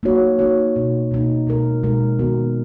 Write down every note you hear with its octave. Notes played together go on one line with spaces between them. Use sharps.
A#3 D#4 F#4 C#5
A#3 D#4 F#4 C#5
B2 A#3 D#4
B2 A#3 D#4
B2 G#3 D#4 A#4
B2 G#3 D#4 A#4
D#3 G#3 B3 F#4 A#4